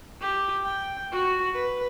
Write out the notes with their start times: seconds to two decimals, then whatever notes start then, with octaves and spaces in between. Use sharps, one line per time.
0.21 G4
0.64 G5
1.11 F#4
1.55 B4